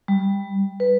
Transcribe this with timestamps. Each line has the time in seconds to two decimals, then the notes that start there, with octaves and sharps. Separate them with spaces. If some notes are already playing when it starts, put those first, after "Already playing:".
0.08 G3
0.80 B4